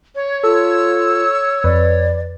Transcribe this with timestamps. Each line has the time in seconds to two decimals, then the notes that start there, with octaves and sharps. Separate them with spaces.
0.16 C#5
0.43 F4 A4 E6
1.64 F2 B4 D5